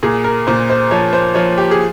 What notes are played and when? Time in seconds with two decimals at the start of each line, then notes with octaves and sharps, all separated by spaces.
0.03 A#2 G#4
0.24 A#4
0.47 A#2 C5
0.70 C5
0.91 F3 C#5
1.13 C5
1.35 F3 C#5
1.58 G4
1.71 G#4